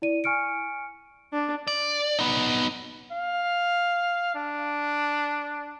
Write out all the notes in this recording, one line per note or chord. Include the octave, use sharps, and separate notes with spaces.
E4 D5 D#7
G#5 C#6 F6 C#7 D7
D4
D5
B3 D#4
F5
D4